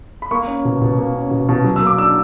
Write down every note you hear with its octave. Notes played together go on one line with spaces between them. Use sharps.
B5
A#3 C#6
C#4
B2
B2
A#3
C#4
B2
B2
F#3
E6
A#3
D6
D4 E6